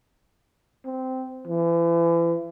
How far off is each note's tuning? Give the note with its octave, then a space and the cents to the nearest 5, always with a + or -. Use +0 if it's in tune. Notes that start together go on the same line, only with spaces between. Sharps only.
C4 -10
E3 +35